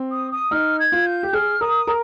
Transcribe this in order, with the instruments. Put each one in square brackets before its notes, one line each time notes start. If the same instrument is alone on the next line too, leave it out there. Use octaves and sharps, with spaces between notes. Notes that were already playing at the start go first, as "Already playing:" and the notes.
Already playing: [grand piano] C4
[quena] D#6
D#6
[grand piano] D#4 [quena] F6
[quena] G#6
[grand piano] F4
[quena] G6
[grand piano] G4
[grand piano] G#4 [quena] F6
[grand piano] A#4 [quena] D#6
[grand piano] A#4